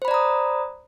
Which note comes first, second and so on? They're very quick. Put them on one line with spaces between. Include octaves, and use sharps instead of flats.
C5 B5 D5 A#5 D#6